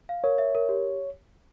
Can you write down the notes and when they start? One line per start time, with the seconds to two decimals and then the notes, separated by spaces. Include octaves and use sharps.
0.09 F5
0.24 A#4 C#5
0.38 E5
0.55 A#4
0.69 G4